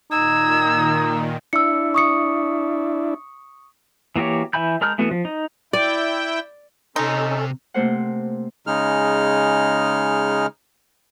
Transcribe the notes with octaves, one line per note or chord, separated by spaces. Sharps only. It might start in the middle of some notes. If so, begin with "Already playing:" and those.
A#2 D#3 D#4 E6 G#6
D4 E4 E6 C#7
C#6 D#6 C#7
E3 A#3 F#4 G4 C#5
E3 E5 G#5 B5 G6
G#3 A#4 A5 F6 G6
E3 A3 B3 F#4
F3
D#4
E4 D5 G5
C3 C#4 D#4 A4 C6
C3 A3 A#3 C5 F#5
C#3 G#3 D#4 F6